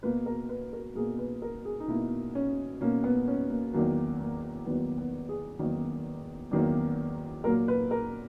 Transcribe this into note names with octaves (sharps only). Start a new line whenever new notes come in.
B2 A#3 B4
A#4
B4
A#4
B2 A#3 G#4
B4
A#4
G#4
D#4
B2 A#3 E4
C#4
B2 A#3 C#4
B3
C#4
A#3
E2 D#3 F#3 A#3
A#3
E2 D#3 F#3 A#3 B3
B3
G#4
E2 D#3 F#3 A#3
E2 D#3 F#3 A#3
A#2 F#3 A#3 A#4
B4
A#4